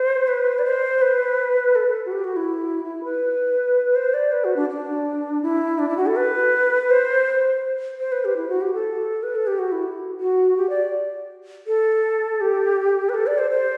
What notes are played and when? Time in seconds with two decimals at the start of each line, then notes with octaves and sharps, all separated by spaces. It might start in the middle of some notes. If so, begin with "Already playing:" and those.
Already playing: C5
0.28 B4
0.59 D5
0.65 C5
1.02 B4
1.75 A4
1.87 A4
2.06 F#4
2.12 G4
2.24 F#4
2.36 E4
2.85 E4
3.04 B4
3.96 C5
4.14 D5
4.32 B4
4.44 F#4
4.56 D4
4.70 D4
5.42 E4
5.79 D4
5.89 E4
5.97 F#4
6.07 A4
6.16 B4
6.90 C5
8.00 C5
8.12 B4
8.25 G4
8.37 E4
8.49 F#4
8.61 G4
8.74 A4
9.23 B4
9.35 A4
9.47 G4
9.59 F#4
9.72 E4
10.20 F#4
10.57 G4
10.70 D5
11.67 A4
12.41 G4
13.09 B4
13.14 A4
13.27 D5
13.38 C5
13.51 C5